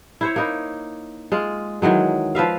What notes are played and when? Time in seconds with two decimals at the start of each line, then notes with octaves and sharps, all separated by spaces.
0.21 E4 C5 C#5
0.36 A#3 D#4 E4
1.32 G#3 F4
1.82 D#3 E3 F#3 G#3
2.35 F3 B4 E5 F5